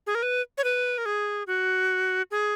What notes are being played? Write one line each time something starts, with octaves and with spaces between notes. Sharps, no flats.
G#4
A#4
B4
C#5
B4
A#4
G#4
F#4
G#4